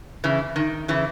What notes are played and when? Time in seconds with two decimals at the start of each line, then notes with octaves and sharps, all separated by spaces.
0.24 C#3 E3
0.56 D#3
0.88 C#3 E3